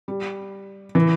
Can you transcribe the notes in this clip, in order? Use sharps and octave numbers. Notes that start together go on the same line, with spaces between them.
G3
E3